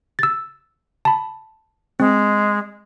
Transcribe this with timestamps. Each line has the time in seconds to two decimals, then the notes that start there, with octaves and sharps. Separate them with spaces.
0.19 E6 A6
1.05 A5 B5
2.00 G#3 C4